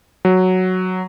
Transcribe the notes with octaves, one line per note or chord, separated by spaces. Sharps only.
F#3